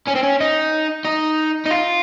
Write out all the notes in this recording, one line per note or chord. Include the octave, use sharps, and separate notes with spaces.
C#4
C4
C#4
D#4
D#4
D#4
F4